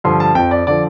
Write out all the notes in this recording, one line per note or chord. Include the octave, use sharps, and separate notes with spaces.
G2 D3 F3 C6
A5
F2 F3 G5
D5
D3 F3 D5